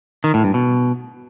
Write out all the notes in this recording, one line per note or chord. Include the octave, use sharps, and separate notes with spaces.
D#3
A2
G2
B2